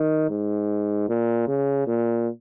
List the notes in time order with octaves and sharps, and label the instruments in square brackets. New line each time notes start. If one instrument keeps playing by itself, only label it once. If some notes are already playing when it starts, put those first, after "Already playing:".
Already playing: [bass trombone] D#3
G#2
A#2
C#3
A#2